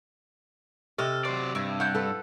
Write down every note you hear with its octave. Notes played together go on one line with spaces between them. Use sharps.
C3 A4 D#5 F6
F#3 C5 D5
G2 E4
E4 F#5 G6
A4 B4